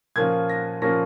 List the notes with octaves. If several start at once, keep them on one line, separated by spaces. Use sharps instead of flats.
A#2 F3 A#3 C#4 F4 G#6
A#6
A#2 F3 A#3 C#4 F4 A#6